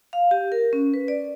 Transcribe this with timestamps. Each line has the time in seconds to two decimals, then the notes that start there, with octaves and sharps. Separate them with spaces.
0.13 F5
0.31 G4
0.52 A#4
0.73 C#4
0.94 B4
1.08 D5